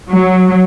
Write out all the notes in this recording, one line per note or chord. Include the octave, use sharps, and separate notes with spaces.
F#3